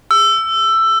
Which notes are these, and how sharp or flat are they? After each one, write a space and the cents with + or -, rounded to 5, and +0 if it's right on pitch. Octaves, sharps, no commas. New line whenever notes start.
E6 +15